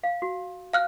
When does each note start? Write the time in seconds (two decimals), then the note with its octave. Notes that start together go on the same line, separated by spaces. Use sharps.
0.03 F5
0.22 F#4
0.73 F5 F6 F#6